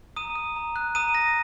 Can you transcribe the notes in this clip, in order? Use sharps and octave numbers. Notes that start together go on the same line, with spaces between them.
A#5 D#6 D#7
D#6
A#5
F#6
A#5 D#6 D#7
D#6 A#6